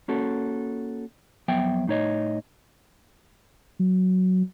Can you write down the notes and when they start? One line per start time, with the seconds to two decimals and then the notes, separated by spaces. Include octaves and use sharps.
0.08 A#3 C#4 F#4 A4
1.48 F2 F#3 B3 E5 G5
1.87 A2 D#4 C#5 D#5
3.79 F#3